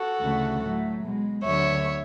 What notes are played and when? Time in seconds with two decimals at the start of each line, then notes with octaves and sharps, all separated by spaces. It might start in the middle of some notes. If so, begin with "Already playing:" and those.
Already playing: F#4 A4
0.21 D2 C#3 E3 A3
0.61 A2 F#3 A3
1.03 B2 G#3
1.43 D2 D3 F#3 C#5 E5